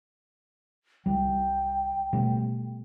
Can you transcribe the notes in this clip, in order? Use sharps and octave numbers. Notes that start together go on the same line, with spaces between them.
C2 G3 G5
B2 G3 A3